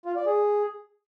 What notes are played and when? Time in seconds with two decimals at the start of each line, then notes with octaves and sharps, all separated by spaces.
0.06 F4
0.16 D5
0.26 G#4